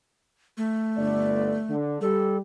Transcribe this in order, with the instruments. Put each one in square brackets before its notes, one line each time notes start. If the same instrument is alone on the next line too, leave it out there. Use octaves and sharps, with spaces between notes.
[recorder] A3
[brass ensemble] G1 D3 D5
D3
[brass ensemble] G3 [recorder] A4